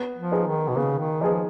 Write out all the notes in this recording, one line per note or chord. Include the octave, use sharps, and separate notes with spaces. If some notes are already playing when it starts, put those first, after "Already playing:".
Already playing: B3
F3
D#4 G#4 B4
D#3
B2
C#3 B3
D#3
F3 D#4 G#4 B4